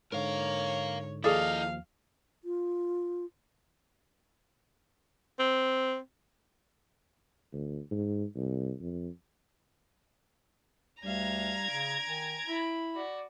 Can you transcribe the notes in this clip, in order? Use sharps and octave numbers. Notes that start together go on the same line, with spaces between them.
G#2 D3 A#4 C#5 F5
D#2 F3 E4 G#4 A4 D5 D#5 F5
F4
C4
D2
G#2
C2
F2
D2 G3 D4 F5 A#5 G#6
C#3 D7
D#3 G#5
E4 B5
F#4 D5